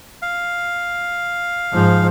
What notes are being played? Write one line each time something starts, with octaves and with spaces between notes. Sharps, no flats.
F5
G#2 F3